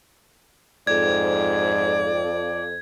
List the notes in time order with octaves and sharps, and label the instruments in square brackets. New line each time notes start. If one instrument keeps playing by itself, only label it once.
[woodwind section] F2 [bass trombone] G#2 [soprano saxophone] D5 [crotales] G#6